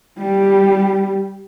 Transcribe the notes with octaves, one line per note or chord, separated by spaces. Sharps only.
G3 G4